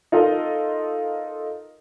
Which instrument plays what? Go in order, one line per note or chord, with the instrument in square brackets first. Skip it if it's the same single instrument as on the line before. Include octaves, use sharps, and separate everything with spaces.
[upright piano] D#4 F4 A4 A#4 D#5